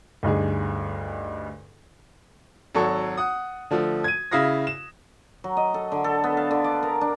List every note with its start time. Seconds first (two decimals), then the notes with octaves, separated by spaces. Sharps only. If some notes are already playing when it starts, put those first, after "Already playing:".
0.23 D2 G2 D#4 G#4
2.75 G#1 F#3 A4 C#6
3.17 F#5 D#6
3.71 D3 F3 A3
4.04 G#6 D#7
4.32 C#3 E4 F5 D#6 A#6
4.67 E7
5.44 F#3
5.57 D#5
5.74 A4
5.92 D3
6.04 A4
6.24 B3
6.37 F5
6.51 D3
6.64 D5
6.83 A#4
7.01 D4